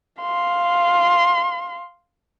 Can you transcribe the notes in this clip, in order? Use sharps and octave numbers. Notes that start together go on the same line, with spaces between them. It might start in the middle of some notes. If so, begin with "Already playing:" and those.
F5 C6